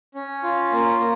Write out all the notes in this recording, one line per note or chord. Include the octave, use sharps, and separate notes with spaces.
C#4
F4
A#3
A#3